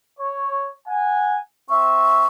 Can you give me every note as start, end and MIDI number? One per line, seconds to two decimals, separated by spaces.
0.17 0.70 73
0.86 1.38 78
0.86 1.38 80
1.69 2.26 60
1.69 2.26 76
1.69 2.27 85